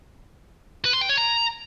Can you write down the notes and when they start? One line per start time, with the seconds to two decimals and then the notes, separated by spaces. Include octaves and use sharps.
0.85 B4
0.93 C6
1.01 G5
1.09 C#5
1.18 A#5